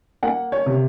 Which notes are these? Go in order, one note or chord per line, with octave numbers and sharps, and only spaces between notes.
A#3 F#5
C#5
C3